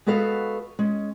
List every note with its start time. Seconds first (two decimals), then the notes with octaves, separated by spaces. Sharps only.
0.06 G#3 B3 F#4 A4 B4 F5
0.79 G#3 C#4